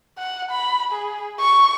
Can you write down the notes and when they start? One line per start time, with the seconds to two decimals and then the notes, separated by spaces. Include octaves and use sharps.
0.18 F#5
0.51 B5
0.92 G#4
1.40 C#6